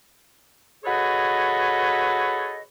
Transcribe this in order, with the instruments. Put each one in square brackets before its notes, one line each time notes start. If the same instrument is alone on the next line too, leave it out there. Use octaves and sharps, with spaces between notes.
[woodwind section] F#4 G#4 A4 B4 C#5 D#5